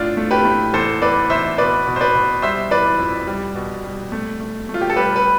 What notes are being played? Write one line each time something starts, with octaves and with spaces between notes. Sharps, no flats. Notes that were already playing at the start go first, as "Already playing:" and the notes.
Already playing: A2 D4 F4
A3
G4 B4
A2
E2 A4 C5
E2 B4 D5
E2 C5 E5
B2 B4 D5
B2
C5
B4 D5
B2
G3 C5 E5
E3 B4 D5
F2
G3
B2
G3
A3
A3
A3
F4
G4
A4
G3 G4 B4
B4